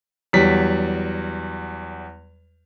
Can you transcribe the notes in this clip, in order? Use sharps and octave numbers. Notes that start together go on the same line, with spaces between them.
E2 F#3 G3 B6